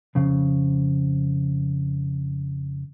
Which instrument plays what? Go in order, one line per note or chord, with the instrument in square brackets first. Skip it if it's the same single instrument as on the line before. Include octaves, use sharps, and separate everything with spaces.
[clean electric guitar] F2 C#3